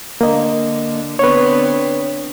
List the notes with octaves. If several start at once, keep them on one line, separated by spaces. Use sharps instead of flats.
D3 A#3 D#5
D3 B3 C4 B4 C#5